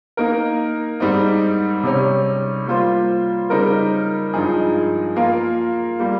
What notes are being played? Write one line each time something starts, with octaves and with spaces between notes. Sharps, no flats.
A#3 D#4 A#4
G#2 G3 C4 D#4
C3 G3 C#4
G3 A#3 F4 C5
C#3 G3 C4 D#4 A#4
G2 F3 G#3 D#4 G#4
A#3 F4 A#4 F5
G3 A#3